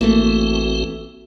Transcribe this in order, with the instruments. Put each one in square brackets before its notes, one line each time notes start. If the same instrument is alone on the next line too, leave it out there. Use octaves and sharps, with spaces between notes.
[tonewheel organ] A1 C4 F#4 [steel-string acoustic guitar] E3 A3 [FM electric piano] A#3